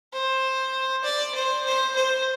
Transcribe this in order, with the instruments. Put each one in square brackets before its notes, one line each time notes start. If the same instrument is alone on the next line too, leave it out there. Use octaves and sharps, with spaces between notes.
[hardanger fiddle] C5
D5
C5
C5
C5